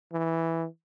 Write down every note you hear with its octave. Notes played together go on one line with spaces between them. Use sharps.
E3